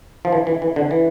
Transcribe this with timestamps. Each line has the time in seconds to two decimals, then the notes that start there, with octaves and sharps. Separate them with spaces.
0.25 F3
0.32 E3
0.47 E3
0.62 E3
0.76 D3
0.91 E3